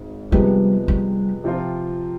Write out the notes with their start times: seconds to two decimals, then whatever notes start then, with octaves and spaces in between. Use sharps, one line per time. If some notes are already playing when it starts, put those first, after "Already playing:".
Already playing: G#1 G#2
0.31 C3 F3 G3 G#3 B3
0.88 G3
1.44 C3 F3 C4 F4